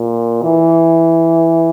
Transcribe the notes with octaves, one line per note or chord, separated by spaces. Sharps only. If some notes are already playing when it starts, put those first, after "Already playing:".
Already playing: A#2
E3